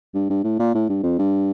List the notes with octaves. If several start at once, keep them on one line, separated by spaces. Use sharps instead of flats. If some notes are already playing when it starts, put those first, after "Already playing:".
G2
G2
A2
A#2
A2
G2
F2
G2